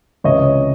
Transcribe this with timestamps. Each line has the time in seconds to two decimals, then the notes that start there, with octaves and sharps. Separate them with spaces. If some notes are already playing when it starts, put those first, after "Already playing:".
0.24 C#2 C3 E3 C#5 D#5